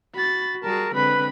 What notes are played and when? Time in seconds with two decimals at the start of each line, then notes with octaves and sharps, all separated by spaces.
0.15 F#4 B5 A6
0.64 G3 F#4 G#4 A#4 A5
0.94 D3 G#3 C4 B4 B5